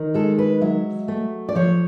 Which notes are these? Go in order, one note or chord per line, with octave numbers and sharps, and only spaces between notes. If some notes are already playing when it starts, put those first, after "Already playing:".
Already playing: D#3
G#3 A4
B4
F#3 E5
A3
D5
F3 C#5